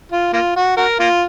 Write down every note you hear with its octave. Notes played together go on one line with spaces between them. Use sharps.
F4
A#3 F4
F#4
F#4 A#4
A#3 F4